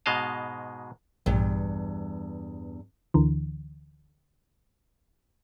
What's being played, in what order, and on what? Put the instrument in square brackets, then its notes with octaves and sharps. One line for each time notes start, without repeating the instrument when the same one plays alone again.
[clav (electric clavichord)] G#2 B2 G#3 D#5 F5 A5
[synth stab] A#1 [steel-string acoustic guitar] E2 G2
[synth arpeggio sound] D2 D3 E3